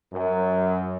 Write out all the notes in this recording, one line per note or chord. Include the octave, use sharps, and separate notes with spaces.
F#2